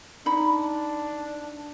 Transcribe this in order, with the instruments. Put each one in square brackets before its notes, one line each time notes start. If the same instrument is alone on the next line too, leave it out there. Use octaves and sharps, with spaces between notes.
[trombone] D4 [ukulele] D#4 B5